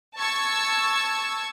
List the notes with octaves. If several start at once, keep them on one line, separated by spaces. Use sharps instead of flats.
A5 C#6 E6 G#6